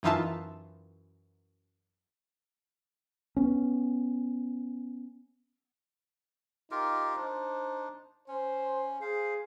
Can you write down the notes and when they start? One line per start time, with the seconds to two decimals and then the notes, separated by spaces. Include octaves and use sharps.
0.03 F#2 E3 D#4 F4 E5 A5
3.37 B3 C#4
6.71 D#4 F4 G4 A#4
7.16 D4 D#4 C5
8.28 C#4 C5
9.01 G#4 C5 F5